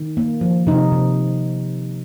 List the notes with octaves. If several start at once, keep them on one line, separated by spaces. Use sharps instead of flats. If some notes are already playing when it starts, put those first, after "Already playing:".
Already playing: D#3
A#3
F3
C3 D#4
C3